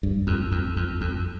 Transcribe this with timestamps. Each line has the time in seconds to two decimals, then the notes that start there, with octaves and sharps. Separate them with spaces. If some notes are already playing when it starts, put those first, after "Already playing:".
0.03 G2
0.27 F2
0.52 F2
0.76 F2
1.01 F2